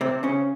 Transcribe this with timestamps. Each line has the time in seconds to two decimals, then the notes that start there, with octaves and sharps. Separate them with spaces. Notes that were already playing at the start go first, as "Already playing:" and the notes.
0.01 C3 C4
0.23 C#3 C#4